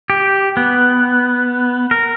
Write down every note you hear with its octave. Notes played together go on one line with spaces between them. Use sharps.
G4
B3
A#4